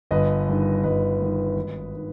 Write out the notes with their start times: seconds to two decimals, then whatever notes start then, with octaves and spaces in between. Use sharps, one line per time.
0.11 G1 B4 D#5
0.48 G2 D#3
0.83 G1 B4 D#5
1.20 G2 D#3
1.56 G#1
1.95 D#3